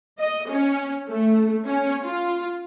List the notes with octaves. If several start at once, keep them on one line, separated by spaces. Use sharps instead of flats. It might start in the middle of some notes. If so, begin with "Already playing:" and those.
D#5
C#4
A3
C#4
F4